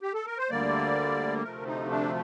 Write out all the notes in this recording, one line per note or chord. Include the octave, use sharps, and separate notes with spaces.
G4
A4
A#4
C5
D2 D3 G3 A#3 D5
D2 C3 F3 A3 A#4
D#4
D4